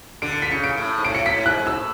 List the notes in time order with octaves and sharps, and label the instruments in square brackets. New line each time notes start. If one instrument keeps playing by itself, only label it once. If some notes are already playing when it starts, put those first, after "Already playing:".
[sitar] D3 [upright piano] D7
[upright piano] C#7
B6
[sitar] C#3 [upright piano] C#7
[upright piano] D7
[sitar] A2
G#2
[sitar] A2 [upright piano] D7
[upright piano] C#7
[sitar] A2 [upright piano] B6
[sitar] G#2 [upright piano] F#6
[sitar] G#2
[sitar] A2 [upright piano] E6